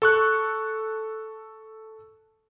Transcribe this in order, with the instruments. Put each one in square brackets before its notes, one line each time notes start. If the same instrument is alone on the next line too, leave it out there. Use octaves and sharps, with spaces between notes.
[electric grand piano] A4 C#6 F#6